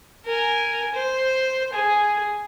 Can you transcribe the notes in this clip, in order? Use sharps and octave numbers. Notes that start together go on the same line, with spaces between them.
A#4 G#5
C5
G#4